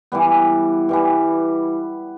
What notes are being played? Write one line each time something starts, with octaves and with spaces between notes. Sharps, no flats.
E3 G3 B3
E3 G3 B3